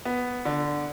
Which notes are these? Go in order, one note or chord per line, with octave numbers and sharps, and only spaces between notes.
B3
D3